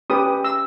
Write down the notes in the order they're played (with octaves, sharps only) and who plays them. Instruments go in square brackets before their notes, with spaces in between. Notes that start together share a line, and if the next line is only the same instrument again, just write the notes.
[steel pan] C#4 G4 B4 D#6
E6